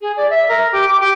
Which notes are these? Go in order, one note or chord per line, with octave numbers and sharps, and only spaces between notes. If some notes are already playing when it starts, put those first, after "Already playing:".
G#4
D5
E5
A#4
G4
D6
G4